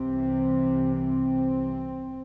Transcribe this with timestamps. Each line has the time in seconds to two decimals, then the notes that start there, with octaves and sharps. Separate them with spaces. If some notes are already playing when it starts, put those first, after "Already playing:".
Already playing: C2 C3 E3 C4
0.95 C4